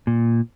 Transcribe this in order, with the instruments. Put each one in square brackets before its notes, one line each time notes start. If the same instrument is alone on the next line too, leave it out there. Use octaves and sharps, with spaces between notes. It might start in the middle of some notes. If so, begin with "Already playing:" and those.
[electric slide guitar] A#2